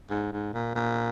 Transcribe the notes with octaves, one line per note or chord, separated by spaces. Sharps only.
G#2
G#2
A#2
A#2